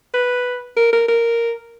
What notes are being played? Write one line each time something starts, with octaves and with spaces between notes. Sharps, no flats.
B4
A#4
A#4
A#4